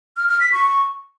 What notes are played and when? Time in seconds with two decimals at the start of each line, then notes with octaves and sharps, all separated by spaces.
0.17 F6
0.29 F6
0.40 B6
0.52 C#6